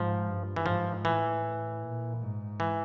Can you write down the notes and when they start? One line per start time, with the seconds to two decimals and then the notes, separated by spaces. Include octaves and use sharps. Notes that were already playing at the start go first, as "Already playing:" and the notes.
Already playing: G#2 F3
0.27 G2
0.56 E3
0.66 G#2 F3
1.05 A2 E3
1.82 A#2
2.21 G#2
2.60 E3